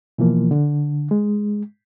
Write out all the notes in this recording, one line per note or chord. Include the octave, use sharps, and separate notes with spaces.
B2 E3 F3 A#3
D3
G#3